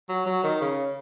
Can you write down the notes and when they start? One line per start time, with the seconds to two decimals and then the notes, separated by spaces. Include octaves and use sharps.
0.09 F#3
0.26 F#3
0.43 D#3
0.61 C#3